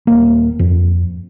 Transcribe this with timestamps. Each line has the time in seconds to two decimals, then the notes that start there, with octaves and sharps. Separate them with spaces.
0.07 D#1 A#3
0.59 F2